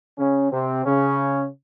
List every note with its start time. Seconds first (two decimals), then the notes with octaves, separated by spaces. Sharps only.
0.16 C#3 C#4
0.51 C3 C4
0.85 C#3 C#4